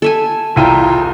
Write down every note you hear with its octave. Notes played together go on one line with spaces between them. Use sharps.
A4 E5 G#5
E1 C2 E4 F4 G5 A#5 D#7